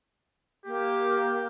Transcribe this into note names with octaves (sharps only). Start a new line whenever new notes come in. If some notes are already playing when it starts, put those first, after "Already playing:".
A#3 G4